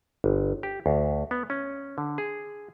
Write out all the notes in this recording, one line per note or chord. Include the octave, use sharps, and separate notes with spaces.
G1
G4
D2
B3
C#4
D3
G#4